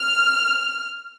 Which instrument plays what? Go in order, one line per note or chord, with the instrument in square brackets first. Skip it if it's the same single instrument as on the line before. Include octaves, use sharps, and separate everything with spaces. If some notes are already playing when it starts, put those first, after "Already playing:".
Already playing: [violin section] F6